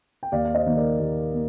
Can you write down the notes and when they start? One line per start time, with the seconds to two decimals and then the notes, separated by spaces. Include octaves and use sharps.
0.23 G5
0.32 D#2 D5 F5
0.45 F5
0.55 C5 D#5
0.66 D#3 A#3
0.77 A#4 D5
1.00 D#2
1.33 A#3